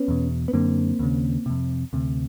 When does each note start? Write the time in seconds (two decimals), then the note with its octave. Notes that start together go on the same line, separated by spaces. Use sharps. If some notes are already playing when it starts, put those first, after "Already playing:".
Already playing: B3 C#4
0.08 E2 B2
0.48 B3
0.53 F#2 D3 A#3 C4
0.99 D#2 C#3
1.46 F2 C3
1.93 D2 C3